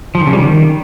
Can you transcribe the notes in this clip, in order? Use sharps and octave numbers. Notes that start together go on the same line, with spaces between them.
F3
D#3
C#3
G3
D#3